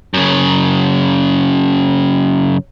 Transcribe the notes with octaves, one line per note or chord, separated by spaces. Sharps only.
F#2 C#3